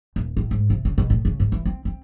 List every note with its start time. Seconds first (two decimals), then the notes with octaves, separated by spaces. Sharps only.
0.16 D#1
0.37 A2
0.51 G#2
0.70 C3
0.85 C#3
0.98 B2
1.10 A2
1.25 C#3
1.40 G#2
1.52 E3
1.66 C4
1.85 C4